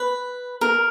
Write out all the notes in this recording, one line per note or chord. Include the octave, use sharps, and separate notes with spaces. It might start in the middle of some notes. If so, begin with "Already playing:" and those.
Already playing: B4
A#4